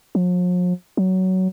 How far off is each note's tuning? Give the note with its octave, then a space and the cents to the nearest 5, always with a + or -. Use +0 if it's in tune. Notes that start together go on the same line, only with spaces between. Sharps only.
F3 +45
F#3 +15